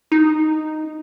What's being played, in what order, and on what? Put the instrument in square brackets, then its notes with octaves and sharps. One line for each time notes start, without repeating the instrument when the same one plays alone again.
[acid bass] D#4